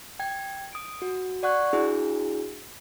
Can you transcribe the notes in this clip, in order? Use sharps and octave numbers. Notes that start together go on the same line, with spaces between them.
G5 G#6
D#6 D7
F#4
D5 F#5 C#6 F#6 G#6
D4 E4 F#4 G#4